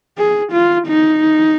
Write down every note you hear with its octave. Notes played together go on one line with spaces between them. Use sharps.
G#4
F4
D#4